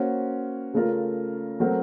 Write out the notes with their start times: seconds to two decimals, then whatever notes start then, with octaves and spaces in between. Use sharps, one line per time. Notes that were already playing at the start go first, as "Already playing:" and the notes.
Already playing: A#3 C#4 F#4 C5
0.74 C#3 A3 C#4 F4 A#4
1.60 F#3 A3 C4 F#4 A#4